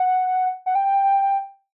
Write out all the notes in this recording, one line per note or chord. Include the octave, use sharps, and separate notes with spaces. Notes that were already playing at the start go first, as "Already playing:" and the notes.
Already playing: F#5
F#5
G5